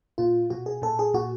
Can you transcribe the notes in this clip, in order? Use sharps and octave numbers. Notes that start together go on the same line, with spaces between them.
A#2 F4
B2 F#4
G#4
A#2 A4
G#4
A#2 F#4